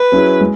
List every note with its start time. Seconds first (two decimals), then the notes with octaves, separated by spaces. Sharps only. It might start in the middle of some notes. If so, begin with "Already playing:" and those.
Already playing: B4
0.12 F#3 C#4 E4 G#4
0.41 G#3